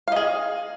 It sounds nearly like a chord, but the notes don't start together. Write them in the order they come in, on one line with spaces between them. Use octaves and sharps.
F5 D#5 G#4